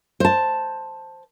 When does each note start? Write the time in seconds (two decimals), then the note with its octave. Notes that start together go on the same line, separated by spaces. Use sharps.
0.20 C5 A5